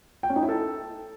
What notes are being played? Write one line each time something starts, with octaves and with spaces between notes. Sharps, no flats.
G5
C#4
D#4
E4
A4